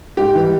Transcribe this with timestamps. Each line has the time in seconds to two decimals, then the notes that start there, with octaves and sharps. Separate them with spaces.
0.17 G#2 G4
0.35 E3 G3